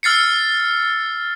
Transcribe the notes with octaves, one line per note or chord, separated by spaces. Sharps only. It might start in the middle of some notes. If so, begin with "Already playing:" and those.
E6 F6 A6 C7 C#7